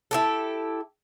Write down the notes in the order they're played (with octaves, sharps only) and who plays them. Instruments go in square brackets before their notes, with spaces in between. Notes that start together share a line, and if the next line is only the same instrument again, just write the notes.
[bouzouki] E4 G4 A4